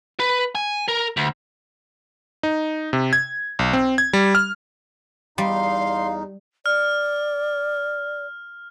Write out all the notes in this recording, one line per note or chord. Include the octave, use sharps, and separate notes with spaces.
B4
G#5
A#4
D2
D#4
C3
G#6
B1
C4
G#6
G3
F6
E2 G3 D#4 F5 C6
D5 F6